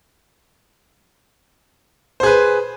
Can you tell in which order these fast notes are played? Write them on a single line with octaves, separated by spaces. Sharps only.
C5 G#4 B4